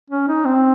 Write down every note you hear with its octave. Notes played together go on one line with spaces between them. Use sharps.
C#4
D#4
C4